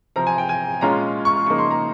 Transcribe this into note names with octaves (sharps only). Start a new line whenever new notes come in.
C3 F3 C4 A#5
G#5
G5
G#5
A#2 G#3 C#4 F4 A#5
C#6
C#3 F3 A#3 D#4 C#6
C6
A#5